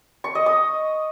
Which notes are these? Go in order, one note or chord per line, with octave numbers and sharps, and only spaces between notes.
C#6
D#5
D#6